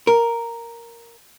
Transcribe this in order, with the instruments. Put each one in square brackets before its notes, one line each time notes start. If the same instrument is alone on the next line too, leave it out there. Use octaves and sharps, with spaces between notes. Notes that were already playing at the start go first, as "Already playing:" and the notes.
[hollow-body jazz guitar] A#4